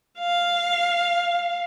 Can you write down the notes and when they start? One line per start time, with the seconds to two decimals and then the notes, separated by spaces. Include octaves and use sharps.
0.19 F5